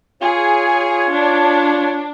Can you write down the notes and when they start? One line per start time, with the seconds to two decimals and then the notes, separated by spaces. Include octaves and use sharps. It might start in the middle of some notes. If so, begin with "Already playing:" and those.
0.22 F4 G#4 C#5
1.12 D4